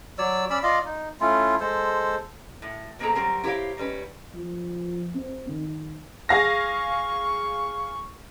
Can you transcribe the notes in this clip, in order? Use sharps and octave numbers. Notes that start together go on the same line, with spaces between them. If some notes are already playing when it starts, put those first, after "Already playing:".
F#3 C#5 D5 E6
C#4 D5 B5 E6
F4 D5 D#5 F5
D#4
A3 C#4 E4 F4
G#3 A4 C5
A2
B2 A#3 C4 G#4 A4 A#5
F#3 G3 C4 A#4
E4 G4 A#4 C5 C#5 F5
D#3 G3 C#4 B4
F3
C4
D#3
G#4 F5 C#6 A#6